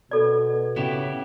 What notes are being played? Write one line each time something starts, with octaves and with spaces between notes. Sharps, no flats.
B2 A4 D5
C#3 B3 E4 G4